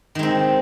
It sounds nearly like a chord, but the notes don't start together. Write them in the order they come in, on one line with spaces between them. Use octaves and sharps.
D#3 G#3 C4